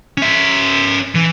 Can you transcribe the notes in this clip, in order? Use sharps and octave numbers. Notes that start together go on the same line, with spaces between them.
C#4 E5
E3